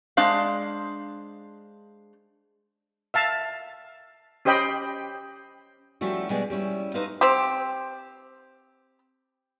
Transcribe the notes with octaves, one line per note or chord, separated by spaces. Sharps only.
G#3 D4 C5 F5
E5 F5 A5
C#4 G4 C5 D#5 G5 B5
F3 G3 A3 C#4 E4 F#4
B2 G3 G#3 B3 D4
G3 C#4 E4
A3 D#4 B4 C5 D#5 F5
C4 G4